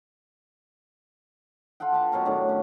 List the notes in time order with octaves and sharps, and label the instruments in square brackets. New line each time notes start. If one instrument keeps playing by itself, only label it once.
[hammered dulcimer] F4 A4 F#5 G5
B4 A5 D6
B2 F#3 A#4 C#6
A2 D#3 D4
C#4